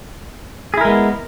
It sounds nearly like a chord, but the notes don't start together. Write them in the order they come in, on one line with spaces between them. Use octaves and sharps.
G#4 E4 A#4 G#3 B3